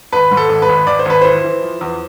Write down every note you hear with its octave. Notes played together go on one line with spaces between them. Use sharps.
G#1 B4
G#2
A4
G#1
B4
G#1
G#1 D5
C5
G#1 B4
E3 C5
E3
F3
E2